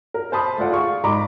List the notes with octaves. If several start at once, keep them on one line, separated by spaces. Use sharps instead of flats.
A#4
C5 A5 B5 D#6
A3 F4 D5 F#5
F4 G#4 F5 C#6
G#2 D5 A#5 B5 D6